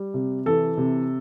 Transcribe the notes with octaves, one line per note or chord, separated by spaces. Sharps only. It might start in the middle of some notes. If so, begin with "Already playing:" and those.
Already playing: G3
C3
E3 A4
C3